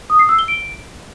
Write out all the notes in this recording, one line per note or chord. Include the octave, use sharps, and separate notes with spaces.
D#6
C7
E6
G7
D7